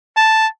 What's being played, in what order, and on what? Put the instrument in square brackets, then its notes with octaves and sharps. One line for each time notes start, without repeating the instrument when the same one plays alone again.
[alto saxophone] A5